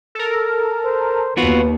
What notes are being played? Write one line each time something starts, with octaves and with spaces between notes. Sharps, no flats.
A4 A#4
C5
D#2 B3 F4 F#4 B4